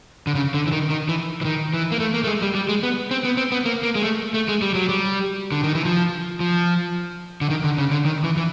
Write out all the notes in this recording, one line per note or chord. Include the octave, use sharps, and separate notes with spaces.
D3
C#3
D3
E3
D#3
D#3
E3
E3
D#3
E3
A#3
A3
A#3
A3
G#3
G3
G3
G#3
B3
C4
B3
C4
B3
A#3
A#3
G#3
A3
A3
G#3
G3
F#3
G3
D3
D#3
E3
F3
F3
D3
D#3
D3
C#3
D3
D#3
E3
E3